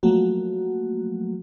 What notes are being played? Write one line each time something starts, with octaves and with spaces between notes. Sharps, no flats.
F3 F#3 A3 A#3 F#4